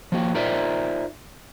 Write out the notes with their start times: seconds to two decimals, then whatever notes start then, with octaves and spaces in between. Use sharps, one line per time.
0.12 F3 A#3 F#4
0.35 D#4 F4 A#4 C5 D5 E5